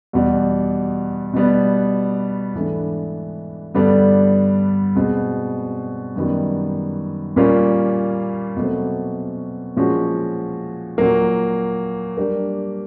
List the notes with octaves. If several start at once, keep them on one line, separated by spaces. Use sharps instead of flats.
E2 B2 G3
B2 G3 B3
G#2 E3 A3 D4
G2 D3 G3 B3 D4
B2 G#3 C4
F#2 D#3 G3 B3
A#2 G3 A#3 C#4 F4
B2 F#3 A3 C4
A#2 F3 G#3 C#4 F#4
A#2 F#3 A#3
G3 A#3 D4 G4 A#4